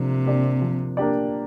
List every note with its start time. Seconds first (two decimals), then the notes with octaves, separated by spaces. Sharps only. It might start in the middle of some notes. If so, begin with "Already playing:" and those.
Already playing: C3 F3 A#3 D4
0.25 A#3 D4 G4 D5
0.62 F3
0.97 A#3 D4 G4 D5